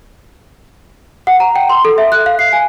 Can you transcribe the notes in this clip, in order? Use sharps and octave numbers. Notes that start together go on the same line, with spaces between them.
F#5
A#5
G5
C6
A4
E5
F#6
F5
C7
G#5